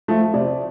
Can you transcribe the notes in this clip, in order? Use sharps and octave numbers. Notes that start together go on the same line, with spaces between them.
F3 A3
C3 D5